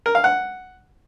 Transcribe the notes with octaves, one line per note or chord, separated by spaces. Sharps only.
A#4
F5
F#5